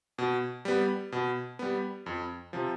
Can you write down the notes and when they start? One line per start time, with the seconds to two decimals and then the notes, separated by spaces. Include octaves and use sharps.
0.18 B2
0.65 G3 B3
1.12 B2
1.59 G3 B3
2.06 F2
2.53 C3 F3